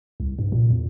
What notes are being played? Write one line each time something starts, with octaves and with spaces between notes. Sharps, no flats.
C2
G2
A#2
E2